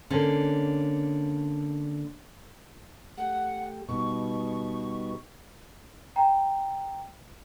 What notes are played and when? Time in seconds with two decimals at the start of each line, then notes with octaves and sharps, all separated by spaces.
0.10 D3 A#3 C#4
3.18 A3 G4 F#5
3.89 B2 G3 D#4 B4 C#6
6.16 G5 A#5